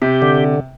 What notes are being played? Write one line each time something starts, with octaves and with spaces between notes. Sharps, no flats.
C3 G4
D3